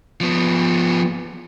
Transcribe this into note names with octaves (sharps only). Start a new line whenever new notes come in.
F3 B3